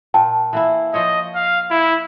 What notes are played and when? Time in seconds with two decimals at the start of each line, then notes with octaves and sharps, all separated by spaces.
0.14 A#2 G5 A5
0.53 E3 A#3 E4
0.94 F3 C5 C#5 D#5
1.35 F5
1.71 E4